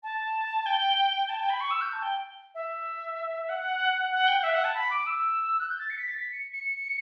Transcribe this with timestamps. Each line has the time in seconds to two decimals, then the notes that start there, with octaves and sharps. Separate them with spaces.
0.03 A5
0.65 G5
1.28 A5
1.39 G5
1.49 B5
1.60 C#6
1.70 E6
1.81 G6
1.91 A5
2.02 G5
2.54 E5
3.48 F#5
4.11 F#5
4.27 G5
4.37 F#5
4.43 E5
4.53 F#5
4.64 A5
4.74 B5
4.90 D6
5.06 E6
5.59 F#6
5.68 G6
5.79 A6
5.89 C#7
5.98 B6
6.07 A6
6.16 B6
6.31 C#7
6.52 C#7